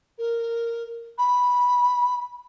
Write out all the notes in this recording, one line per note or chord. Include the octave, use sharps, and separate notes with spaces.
A#4
B5